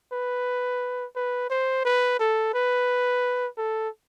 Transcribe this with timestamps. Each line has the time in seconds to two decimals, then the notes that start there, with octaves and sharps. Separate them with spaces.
0.12 B4
1.16 B4
1.50 C5
1.85 B4
2.19 A4
2.54 B4
3.58 A4